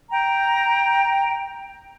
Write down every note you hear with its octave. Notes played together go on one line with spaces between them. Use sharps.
G5 A#5